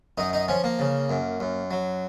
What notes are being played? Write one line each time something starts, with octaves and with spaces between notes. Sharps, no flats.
F#2 D#4
D#4
F3 C#4
A#3
C#3
F#2
F#2
F#3